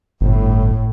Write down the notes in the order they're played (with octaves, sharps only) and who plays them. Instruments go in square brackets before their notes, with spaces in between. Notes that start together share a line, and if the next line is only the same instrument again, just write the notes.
[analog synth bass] G1 [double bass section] A2